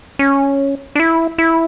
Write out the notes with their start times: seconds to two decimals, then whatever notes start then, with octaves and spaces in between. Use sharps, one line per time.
0.19 C#4
0.95 D4
1.00 E4
1.38 E4